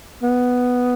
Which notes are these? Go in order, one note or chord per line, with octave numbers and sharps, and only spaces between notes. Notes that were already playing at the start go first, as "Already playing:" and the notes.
B3